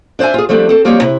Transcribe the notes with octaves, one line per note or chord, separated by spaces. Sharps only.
D4 C5 D5 E5 G#5
F4 G#4
F3 G3 A3 C4 D4
C4 A4
F3 G3 A#3 C4 D#4 C#5
C3 E4